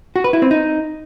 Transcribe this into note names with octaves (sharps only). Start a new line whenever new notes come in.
F#4
B4
E4
C4
D#4